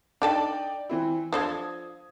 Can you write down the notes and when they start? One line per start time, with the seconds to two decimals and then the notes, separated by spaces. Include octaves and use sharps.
0.22 D4 D#4 A4 D5 G5 A5
0.89 E3 C4 E4
1.33 F3 D4 A4 D#6 G#6